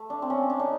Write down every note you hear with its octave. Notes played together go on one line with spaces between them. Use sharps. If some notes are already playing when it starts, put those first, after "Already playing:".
Already playing: A3
D4
C4
C#4
D4
D#4